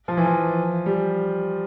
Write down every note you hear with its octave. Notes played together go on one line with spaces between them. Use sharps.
F3
E3
F3
G3